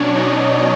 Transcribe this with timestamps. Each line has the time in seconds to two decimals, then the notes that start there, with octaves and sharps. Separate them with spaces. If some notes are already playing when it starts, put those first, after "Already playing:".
Already playing: B2 F#3 C#4 D4 C#5 D5
0.15 D#4 D#5